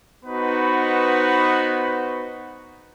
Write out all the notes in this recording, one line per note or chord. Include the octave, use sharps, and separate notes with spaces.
B3 D#4 F#4 B4 C5